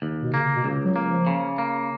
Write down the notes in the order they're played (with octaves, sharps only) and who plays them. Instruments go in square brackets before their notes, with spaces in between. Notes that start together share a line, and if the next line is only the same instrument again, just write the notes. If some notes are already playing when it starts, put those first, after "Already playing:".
[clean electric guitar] D#2
[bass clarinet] B2
[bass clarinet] C#3 [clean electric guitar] A#3
[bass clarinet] B2
[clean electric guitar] C#2 [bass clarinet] C#3
[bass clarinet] F#3
[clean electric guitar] A#3
[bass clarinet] F3
[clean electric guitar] C#3
A#3